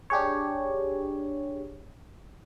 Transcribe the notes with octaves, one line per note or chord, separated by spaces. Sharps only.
D4 G4 G#4 C#5